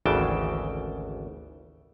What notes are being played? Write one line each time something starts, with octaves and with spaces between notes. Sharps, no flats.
G#1 D2 C#3 E3 G5 A5